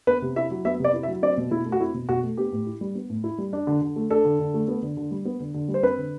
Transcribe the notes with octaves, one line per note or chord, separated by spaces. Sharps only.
B3 B4
C3
E4 E5
F#3
B3 E5
C3 D5
E4
E5
F#3
C4 D5
B2
B2 E4
A3
F#4
C4 E4
B2
B2 F#4
A3
B3 G4
A2
E4
G3
B3
A2
E4
G3
D4
D3
D3
A3
D4 A4
D3
D3
A3
B3
D3
D3
G3
B3
D3
D3
G3
C5
C4 B4
D3